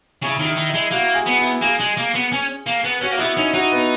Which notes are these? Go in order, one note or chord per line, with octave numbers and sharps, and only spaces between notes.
C#3 E4
D#3
E4
D#3
E4
G#3
A#3 F#4
G#4
B3
E4
A#3 G#4
G#3
A#3
B3
C#4
A#3
B3
C#4 F#4
A#3
B3 E4
C#4 D#4
D#4 F#4
B3